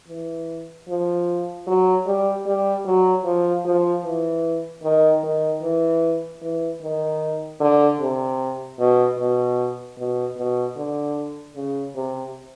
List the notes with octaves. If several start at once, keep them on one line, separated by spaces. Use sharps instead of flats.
E3
F3
F#3
G3
G3
F#3
F3
F3
E3
D#3
D#3
E3
E3
D#3
D3
C3
B2
B2
B2
B2
D3
C#3
C3